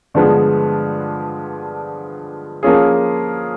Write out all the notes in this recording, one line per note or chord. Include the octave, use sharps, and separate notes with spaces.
G2 D3 F3 G#3 B3
F3 A#3 C#4 F4 G#4